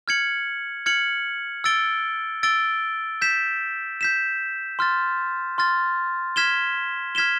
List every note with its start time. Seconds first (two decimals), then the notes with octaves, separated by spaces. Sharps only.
0.08 F6 G#6 C#7 F#7
0.86 F6 G#6 C#7 F#7
1.64 E6 A6 D7 G7
2.43 E6 A6 D7 G7
3.22 G6 B6 E7
4.01 G6 B6 E7
4.79 C6 F6 A6
5.58 C6 F6 A6
6.36 F6 G#6 B6 E7 G7
7.15 F6 G#6 B6 E7 G7